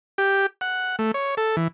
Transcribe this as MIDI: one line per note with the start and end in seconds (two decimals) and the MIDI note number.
0.18 0.46 67
0.61 0.96 78
0.99 1.12 57
1.14 1.35 73
1.37 1.56 69
1.57 1.68 52